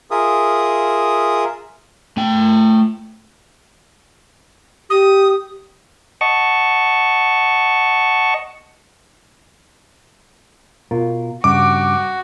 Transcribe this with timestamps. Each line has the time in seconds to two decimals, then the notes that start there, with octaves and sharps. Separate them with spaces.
0.11 F4 G#4 A#4 E5 D#6
2.17 A3 G5
4.90 G4 D#6
6.21 D#5 F#5 A5 C#6
10.91 B2 F4 A#4
11.44 G2 C#3 F#4 D6